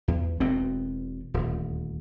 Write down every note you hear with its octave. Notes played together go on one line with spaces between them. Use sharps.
E2
E1 B2 C4
D#1 D2